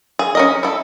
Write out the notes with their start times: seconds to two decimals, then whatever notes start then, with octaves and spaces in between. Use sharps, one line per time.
0.19 G#4
0.35 C#4 A#4 D#5
0.63 E4 A4